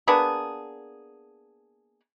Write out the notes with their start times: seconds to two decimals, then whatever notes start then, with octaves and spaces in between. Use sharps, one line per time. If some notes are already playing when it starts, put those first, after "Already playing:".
0.08 A#3 B3 D4 G#4